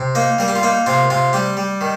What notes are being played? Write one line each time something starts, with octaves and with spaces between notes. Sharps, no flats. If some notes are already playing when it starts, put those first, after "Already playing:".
Already playing: C3
A#3 D#4
G3 A#4
G4
F4
A#3 D#4
C3 F4
C3 F4
G3 G4
G3
D#3